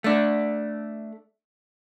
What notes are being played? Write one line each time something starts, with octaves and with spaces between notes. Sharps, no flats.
A3 D4